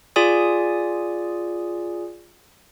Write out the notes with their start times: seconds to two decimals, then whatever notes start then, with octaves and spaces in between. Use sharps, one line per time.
0.16 F4 G#4 D5 G#5 D#6